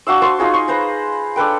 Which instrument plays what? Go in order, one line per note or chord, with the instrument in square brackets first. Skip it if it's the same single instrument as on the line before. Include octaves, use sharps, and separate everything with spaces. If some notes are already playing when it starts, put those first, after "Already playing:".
[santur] D4 F#4 F5 E6
C5 A5 C6 C#6
D#4 F4 G#4 D#5
C6 C#6
B4 C5 A#5
D4 A4 B4 G5